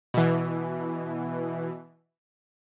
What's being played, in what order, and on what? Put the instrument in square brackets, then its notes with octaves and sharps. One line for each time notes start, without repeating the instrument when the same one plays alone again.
[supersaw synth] B2 E3